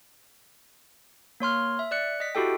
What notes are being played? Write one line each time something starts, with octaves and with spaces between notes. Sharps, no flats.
A#3 C#5 C6 F6
E5
D5 F#6 C#7
D#5 B6
E4 F#4 G4 A4 G5